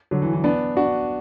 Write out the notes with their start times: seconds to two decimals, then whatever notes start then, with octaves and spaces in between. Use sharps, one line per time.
0.11 D3 F#3
0.22 E3
0.33 E3
0.44 B3 D4
0.77 D4 F#4